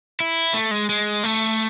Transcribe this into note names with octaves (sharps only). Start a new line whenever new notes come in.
E4
A3
G#3
G#3
A3